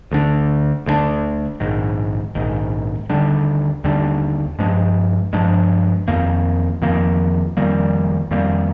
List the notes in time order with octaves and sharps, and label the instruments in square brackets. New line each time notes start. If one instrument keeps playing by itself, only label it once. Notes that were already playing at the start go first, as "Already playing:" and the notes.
[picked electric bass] D2 D3 G#3 D4
D2 D3 G#3 D4
A#1 G#2 D#3
A#1 G#2 D#3
D#2 D3 G3 D4
D#2 D3 G3 D4
G2 F3 G#3 D4
G2 F3 G#3 D4
F2 D#3 A#3
F2 D#3 A#3
F2 D#3 G3 A#3
F2 D#3 G3 A#3